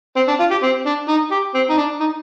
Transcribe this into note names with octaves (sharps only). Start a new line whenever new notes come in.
C4
D4
F4
G4
C4
D4
D#4
G4
C4
D#4
D4
D#4